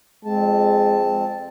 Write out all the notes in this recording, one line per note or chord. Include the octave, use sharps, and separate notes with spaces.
F2 G#3 C4 A5